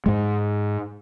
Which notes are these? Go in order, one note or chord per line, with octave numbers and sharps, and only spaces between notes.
G#2 G#3